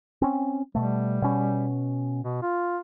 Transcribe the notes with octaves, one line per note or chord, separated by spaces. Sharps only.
C4 C#4
B2 G3 A3
B2 C#4
B2
F4